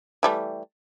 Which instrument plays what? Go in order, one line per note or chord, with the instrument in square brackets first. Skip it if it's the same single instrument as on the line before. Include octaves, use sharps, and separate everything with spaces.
[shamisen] E3 G3 A3